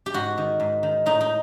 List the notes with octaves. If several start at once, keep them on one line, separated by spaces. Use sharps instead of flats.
G4
G#2 F#4
D#3
G#2
D#3
A2 D#4
D#4